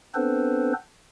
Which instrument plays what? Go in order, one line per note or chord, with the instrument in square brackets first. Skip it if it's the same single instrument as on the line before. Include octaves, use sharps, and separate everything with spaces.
[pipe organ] B3 C4 D4 A4 B4 C5